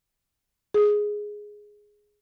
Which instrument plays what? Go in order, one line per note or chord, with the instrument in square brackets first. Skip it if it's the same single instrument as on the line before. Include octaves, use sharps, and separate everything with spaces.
[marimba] G#4